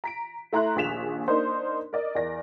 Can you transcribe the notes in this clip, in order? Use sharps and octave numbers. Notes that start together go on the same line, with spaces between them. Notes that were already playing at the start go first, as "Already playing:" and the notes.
A#5 B6 D7
A3 E4 A#5 C6 F#6
A#1 D#2 G#4 B6 E7 F7
A#3 D4 D#4 A#4 C5
A#4 D5 D#5
E2 A#4 D5 A#6